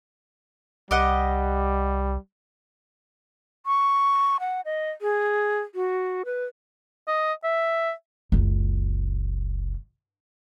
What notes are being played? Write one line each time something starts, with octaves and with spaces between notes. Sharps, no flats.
C2 G3 G4 D#5 F#5
C#6
F#5
D#5
G#4
F#4
B4
D#5
E5
F#1 C#2